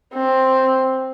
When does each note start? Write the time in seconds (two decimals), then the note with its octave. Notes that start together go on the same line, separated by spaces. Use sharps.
0.14 C4